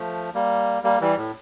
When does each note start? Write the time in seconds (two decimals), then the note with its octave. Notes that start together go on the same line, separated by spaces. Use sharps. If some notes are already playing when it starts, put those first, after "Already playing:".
Already playing: F3 A3
0.34 G3 A#3
0.84 G3 A#3
1.01 E3 G3
1.17 A2